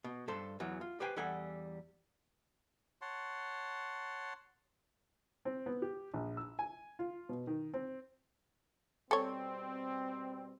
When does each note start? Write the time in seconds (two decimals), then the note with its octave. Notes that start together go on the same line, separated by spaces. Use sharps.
0.04 B2
0.28 G2 A4 C5
0.60 E2 E3 F#3
0.81 F4
1.00 G4 B4 C5 G5 G#5
1.16 E2 G3 A4 F#5 G#5
3.01 C#5 F#5 A5 C6
5.45 C4
5.66 B3
5.82 G4
6.14 A#1
6.37 E6
6.59 G#5
6.99 F4
7.29 B2
7.47 D#3
7.74 C4
9.11 B2 G3 C4 A4 C#5